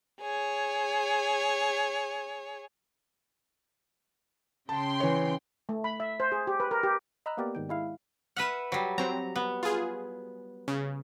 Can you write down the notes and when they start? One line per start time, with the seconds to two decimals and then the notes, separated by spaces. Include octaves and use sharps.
0.21 G#4 C#5
4.69 C#3 G5 A5 C6
5.00 E3 C#5
5.69 A3
5.84 B5
6.00 E5
6.20 C5
6.32 G#4
6.47 G4
6.60 B4
6.71 A#4
6.83 G4
7.26 D#5 A#5 B5 E6 F#6
7.37 A#3 B3 G4 A#4 D5
7.55 G#2 D#3 G5
7.69 G#3 E4 F5
8.37 B4 E5 F#5 F6 D#7 E7
8.72 F#3 G3
8.98 F#3 C4 A#5
9.36 B3
9.63 F4 G#4
10.68 C#3